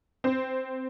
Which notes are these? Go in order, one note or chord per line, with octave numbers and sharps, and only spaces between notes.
C4